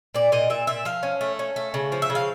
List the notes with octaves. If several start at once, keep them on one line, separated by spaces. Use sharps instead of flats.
A#2 D5
A#2 D#5
A#2 E5
A#2 E5
F3 F5
C#4
A3
C#4
A3
C#3
F3
E5
C#3
F5